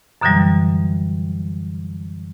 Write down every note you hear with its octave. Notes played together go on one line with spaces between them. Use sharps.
F#2 B2 D3 E3 F#3 G3